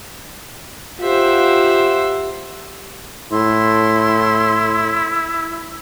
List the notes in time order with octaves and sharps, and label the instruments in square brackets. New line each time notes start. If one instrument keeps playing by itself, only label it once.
[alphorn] F4 [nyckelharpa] G4 F#5 [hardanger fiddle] C5 E5
[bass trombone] A2 [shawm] E4 [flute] C6